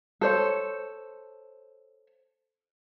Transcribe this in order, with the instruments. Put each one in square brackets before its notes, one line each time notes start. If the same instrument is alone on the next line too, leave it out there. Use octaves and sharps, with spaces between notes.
[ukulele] A4 C5 C#5